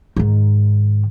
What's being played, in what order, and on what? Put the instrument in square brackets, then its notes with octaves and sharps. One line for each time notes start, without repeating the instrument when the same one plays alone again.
[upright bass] G#2 D#3